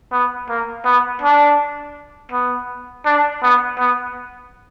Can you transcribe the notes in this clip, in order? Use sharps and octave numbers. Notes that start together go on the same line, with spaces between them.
B3
A#3
B3
D4
B3
D4
B3
B3